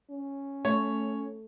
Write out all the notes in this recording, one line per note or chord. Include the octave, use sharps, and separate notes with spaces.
C#4
A3 C#5